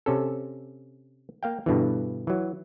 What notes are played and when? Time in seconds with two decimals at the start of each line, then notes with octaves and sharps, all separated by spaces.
0.06 C3 C#4 A4
1.43 A#3 F5 G5
1.66 G2 B2 D3 E3
2.27 E3 F#3